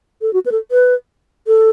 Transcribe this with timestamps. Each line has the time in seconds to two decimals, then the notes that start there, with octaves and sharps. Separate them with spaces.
0.22 A4
0.33 F#4
0.46 B4
0.52 A4
0.71 B4
1.47 A4